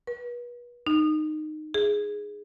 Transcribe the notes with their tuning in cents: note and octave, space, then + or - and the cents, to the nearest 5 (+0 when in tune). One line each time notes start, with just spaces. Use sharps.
B4 -35
D#4 -15
G#4 +0